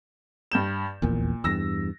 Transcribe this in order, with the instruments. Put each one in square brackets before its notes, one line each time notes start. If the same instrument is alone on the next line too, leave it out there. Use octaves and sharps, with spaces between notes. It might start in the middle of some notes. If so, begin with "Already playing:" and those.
[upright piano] G2 G6 E7
[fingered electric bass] D#1 A#1 E2 [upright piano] A#2
[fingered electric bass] E2 G2 [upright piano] E6 A#6